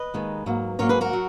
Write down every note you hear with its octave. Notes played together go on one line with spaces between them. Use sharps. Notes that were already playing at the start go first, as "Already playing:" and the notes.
Already playing: B4 D#5
D#2 D#3 G#3
G#2 F#3 A#3
G#2 F#3 A#3 A#4 C#5
G#4 B4
F#4 A#4
F#3